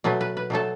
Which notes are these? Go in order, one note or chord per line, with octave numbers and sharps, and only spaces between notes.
B2 F#3 A3 B4
B4
B4
B2 F#3 A3 A4